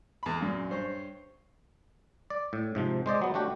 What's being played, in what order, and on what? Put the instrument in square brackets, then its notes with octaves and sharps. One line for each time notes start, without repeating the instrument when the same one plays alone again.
[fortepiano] E2 B5
F#2 A#2
G2 C5 C#5
[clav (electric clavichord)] D5
A2
G#2 C3 F3
G#3 C5 D5 D#5
F#3 B3
A3 D4 F#4 G4